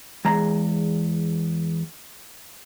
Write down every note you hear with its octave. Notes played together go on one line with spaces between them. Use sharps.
E2 G#3 A#5